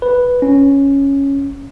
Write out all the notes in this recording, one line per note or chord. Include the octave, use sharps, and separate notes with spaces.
B4
C#4